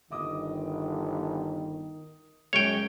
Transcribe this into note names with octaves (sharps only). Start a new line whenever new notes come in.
G1 D#3 D#5 D6 D#6
F#2 G#3 C#5 G5 C#6 F7